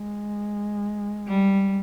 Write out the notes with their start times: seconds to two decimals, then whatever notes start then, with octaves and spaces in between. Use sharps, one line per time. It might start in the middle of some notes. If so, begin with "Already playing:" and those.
Already playing: G#3
1.27 G3